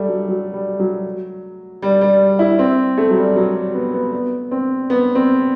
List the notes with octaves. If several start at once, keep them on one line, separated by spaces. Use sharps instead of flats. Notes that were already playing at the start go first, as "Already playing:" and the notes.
Already playing: G3 A3
F#3
F#3
G3
F#3
G3
G3
E4
C4
A3
F#3
G3
F#3
G3
B3
B3
B3
C4
B3
C4